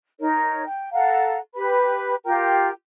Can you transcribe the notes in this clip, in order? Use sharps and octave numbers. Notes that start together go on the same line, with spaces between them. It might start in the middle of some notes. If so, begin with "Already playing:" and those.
D#4 A#4 C#5
G5
A4 F5 F#5 A#5
G4 B4 B5
F4 G4 A#4 G5